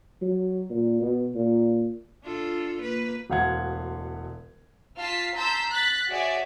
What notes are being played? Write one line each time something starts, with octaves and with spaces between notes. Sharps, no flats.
F#3
A#2
B2
A#2
D4 F4 A4
A#3 B4
E1 D2 F5 F#5 G#6
F4 A5 F6 B6 C7
A5 A#5 C6 E6 G6 B6
F#6 A6 B6
F#4 G#4 C#5 D5 E5